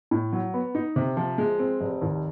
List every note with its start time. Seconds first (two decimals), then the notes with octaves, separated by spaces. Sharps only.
0.11 A2
0.33 F#3
0.54 B3
0.75 D#4
0.96 C3
1.17 F3
1.38 G#3
1.59 C4
1.80 F1
2.02 D#2